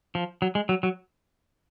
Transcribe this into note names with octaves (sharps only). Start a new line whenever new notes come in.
F3
F#3
G#3
F#3
F#3